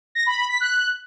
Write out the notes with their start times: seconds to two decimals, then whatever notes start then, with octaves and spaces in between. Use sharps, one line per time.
0.15 A#6
0.26 B5
0.38 B5
0.49 B6
0.60 F#6